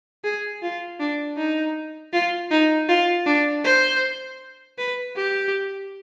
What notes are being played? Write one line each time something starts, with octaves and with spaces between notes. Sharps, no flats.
G#4
F4
D4
D#4
F4
D#4
F4
D4
C5
B4
G4